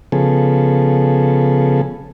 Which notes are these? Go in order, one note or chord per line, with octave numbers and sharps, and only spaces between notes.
C#3 F3 B3 G#4 A4